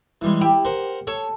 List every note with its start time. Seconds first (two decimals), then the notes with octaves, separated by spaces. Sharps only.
0.21 E3 G3 G#3
0.41 E4 G4
0.65 A#4 C5 F#5
1.07 A4 C#5